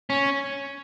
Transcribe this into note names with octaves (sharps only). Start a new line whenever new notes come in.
C#4